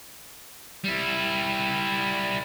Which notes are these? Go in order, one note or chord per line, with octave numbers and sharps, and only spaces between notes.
G3 E4